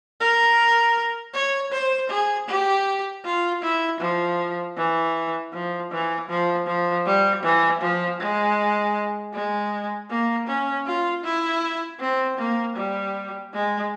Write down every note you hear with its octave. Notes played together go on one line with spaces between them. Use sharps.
A#4
C#5
C5
G#4
G4
F4
E4
F3
E3
F3
E3
F3
F3
G3
E3
F3
G#3
G#3
A#3
C#4
F4
E4
C4
A#3
G3
G#3